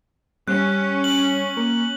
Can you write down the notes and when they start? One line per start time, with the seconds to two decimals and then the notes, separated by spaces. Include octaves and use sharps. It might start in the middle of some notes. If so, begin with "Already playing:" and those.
0.48 G3 C#4 F#6
1.04 F#7
1.57 A#3